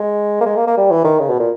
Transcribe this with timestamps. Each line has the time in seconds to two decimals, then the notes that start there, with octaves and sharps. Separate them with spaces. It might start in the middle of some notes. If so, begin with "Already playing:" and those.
Already playing: G#3
0.41 A#3
0.46 G#3
0.56 A#3
0.67 A#3
0.77 G3
0.91 E3
1.04 D#3
1.19 C#3
1.30 B2
1.40 A#2